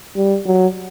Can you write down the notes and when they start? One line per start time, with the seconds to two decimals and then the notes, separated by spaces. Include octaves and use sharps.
0.16 G3
0.46 F#3